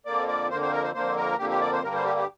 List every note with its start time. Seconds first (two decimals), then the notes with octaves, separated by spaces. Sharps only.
0.06 F2 D3 A#3 D5
0.28 D5
0.50 F2 D3 A#3 C5
0.62 C5
0.73 A#4
0.84 C5
0.95 F2 D3 A#3 C5
1.17 A#4
1.39 F2 D3 A#3 G4
1.50 G4
1.61 D5
1.73 C5
1.83 G2 D3 G3 A#3 A#4
1.95 C5
2.05 G4
2.17 G4